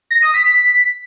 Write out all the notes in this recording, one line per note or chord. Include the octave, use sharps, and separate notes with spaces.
A#6
D#6
B6
B6